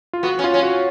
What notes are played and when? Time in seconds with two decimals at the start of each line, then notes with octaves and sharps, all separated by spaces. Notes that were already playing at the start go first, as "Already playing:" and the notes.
0.13 F4
0.23 B3 F#4
0.39 C#4
0.44 F4
0.54 C#4
0.63 F#4